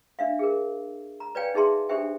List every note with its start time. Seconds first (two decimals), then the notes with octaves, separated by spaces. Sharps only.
0.19 D4 E5 F5
0.39 G#4 A#4
1.20 A#5
1.35 B4 C#5 D5 F5 G5 G#5
1.55 D#4 G#4 E5 A5 C6
1.89 D4 G4 A4 C5 E5 G5